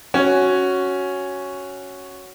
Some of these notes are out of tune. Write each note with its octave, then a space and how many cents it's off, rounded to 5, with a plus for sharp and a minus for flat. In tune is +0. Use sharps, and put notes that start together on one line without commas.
C#4 +0 F#4 +0